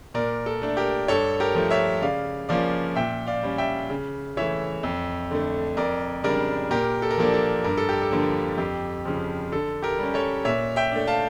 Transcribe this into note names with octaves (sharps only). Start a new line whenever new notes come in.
A#2 A#4 D5
A4
A3 D4
G4 A#4
G2 A4 C#5
G4 A#4
F3 A3
C#5 E5
C#3 D5 F5
F3 A#3 C#4 D5 F5
A#2 E5 G5
D5 F5
G3 C#4
E5 G5
C#3
E3 A3 C#5 E5
F2
D3 A3
F2 A#4 D5
C#3 G3 D4 A#4 D5
A#2 G4 A#4
A4
A#4
F3 A#3 D4 A4
A4
G2 A#4
A4
G4
A4
D3 F3 A#3 D4
F2 G4
C#3 F3
D3 A4
G4 A#4
G3 C#4
A4 C#5
A#2 C#5 E5
E5 G5
A3 D4
F5 A5